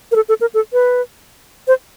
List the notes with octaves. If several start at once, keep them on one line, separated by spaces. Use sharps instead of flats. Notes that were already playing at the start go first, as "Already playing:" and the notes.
A#4
A4
A4
A#4
A4
B4
C5